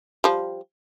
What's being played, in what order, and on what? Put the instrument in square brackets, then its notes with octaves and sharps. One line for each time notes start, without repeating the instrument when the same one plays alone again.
[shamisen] F3 G3